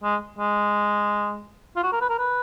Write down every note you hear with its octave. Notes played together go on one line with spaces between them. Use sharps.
G#3
G#3
F4
F#4
A#4
B4
A#4
B4